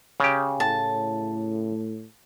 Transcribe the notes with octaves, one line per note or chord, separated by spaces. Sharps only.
C#3 G4
A2 A5